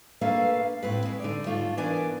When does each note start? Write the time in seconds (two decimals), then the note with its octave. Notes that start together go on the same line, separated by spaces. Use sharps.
0.21 A3 A#3 D4 A4 B4 F5
0.83 A2 C4 B4
1.05 G#3
1.20 D3 D#4 D5
1.46 G#2 A3 F4
1.77 E3 B3 D4 A#4 D5 G#5